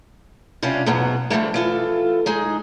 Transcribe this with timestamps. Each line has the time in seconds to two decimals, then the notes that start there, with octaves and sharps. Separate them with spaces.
0.63 C3 G3 C#4 D4 F4
0.86 E2 G#2 B2 F#3 B3
1.30 D3 F3 G3 A3 A#3
1.54 E3 F4 A4
2.26 G#3 D#4 G#4